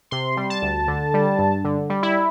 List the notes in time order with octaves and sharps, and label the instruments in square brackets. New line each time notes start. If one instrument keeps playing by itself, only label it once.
[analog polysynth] C3 C6
G3
A5
D2
D3
G3
G2
D3
G3
E4